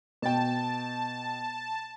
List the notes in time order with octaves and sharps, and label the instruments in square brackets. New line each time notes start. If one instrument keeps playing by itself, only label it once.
[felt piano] B2 G5 [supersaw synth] A5